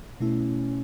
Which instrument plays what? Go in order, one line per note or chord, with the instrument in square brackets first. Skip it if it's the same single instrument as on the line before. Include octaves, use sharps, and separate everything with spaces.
[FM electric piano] B2 A3 E4 [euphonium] C#4